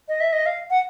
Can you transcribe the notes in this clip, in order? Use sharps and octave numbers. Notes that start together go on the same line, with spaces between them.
D#5
E5
D#5
F5
F#5